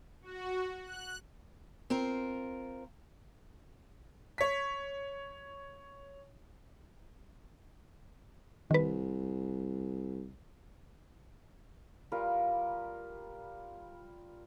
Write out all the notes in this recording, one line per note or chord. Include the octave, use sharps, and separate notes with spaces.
F#4
F#6
C4 F4 A#4
C#5 B6
C2 D#3 B4
G3 F4 A#4 B4